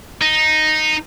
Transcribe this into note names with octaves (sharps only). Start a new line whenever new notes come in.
D#4